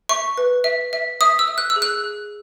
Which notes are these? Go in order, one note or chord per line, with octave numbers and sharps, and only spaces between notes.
E5 C#6
B4
E5
E5
E5 D#6
E6
E5
F#6
E6
G#4
F#6
G#4